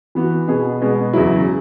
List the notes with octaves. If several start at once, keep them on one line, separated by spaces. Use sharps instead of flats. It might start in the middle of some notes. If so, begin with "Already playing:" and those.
E3 B3 F#4
B2 B3 G#4
B2 G#3 B3
E2 C#3 F#3 E4